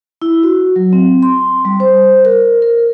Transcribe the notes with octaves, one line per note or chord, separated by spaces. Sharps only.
E4
F#4
F#3
C4
C6
G3
C5
A#4
A#4